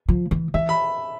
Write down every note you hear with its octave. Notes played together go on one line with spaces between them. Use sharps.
F3
E3
E3 E5
B5